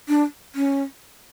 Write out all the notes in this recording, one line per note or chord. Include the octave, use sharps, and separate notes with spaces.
D4
C#4